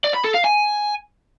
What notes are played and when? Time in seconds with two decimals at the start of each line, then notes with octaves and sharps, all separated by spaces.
0.04 D5
0.14 B5
0.24 A4
0.35 F5
0.45 G#5